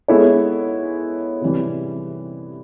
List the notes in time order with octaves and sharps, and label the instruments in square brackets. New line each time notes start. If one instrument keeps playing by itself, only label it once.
[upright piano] G#3 B3 E4 A4 C#5
C3 E3 G3